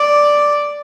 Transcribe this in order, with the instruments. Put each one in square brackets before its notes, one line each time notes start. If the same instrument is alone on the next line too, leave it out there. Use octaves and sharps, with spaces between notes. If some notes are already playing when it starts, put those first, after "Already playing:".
Already playing: [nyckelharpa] D5